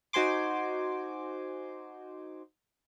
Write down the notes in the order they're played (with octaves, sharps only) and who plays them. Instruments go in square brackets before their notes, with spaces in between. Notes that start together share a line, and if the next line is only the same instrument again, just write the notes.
[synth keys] D#4 F#4 C5 G#5 C6 D6